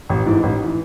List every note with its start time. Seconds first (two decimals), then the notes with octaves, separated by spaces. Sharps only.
0.10 A1
0.26 G#2 E3
0.43 A1
0.65 E3